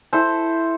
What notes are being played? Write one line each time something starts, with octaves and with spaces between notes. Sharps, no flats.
E4 A4 C5